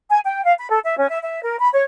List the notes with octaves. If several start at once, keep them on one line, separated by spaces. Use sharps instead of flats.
G#5
G5
F5
B5
A4
E5
C#4
E5
E5
A#4
B5
C#5